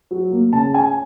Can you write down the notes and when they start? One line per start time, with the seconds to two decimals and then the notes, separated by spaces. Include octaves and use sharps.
0.11 F#3
0.31 A#3
0.53 C#3 A5
0.74 C#4 G#5